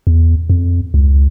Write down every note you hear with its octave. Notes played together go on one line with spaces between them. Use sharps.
E2
F2
C#2